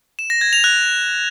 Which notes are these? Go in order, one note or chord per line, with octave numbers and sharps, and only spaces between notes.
E7
A#6
G#6
F7
F#6